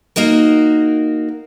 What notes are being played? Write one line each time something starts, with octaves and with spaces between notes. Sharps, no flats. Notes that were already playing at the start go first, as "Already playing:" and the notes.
A#3 D#4 F#4 A#4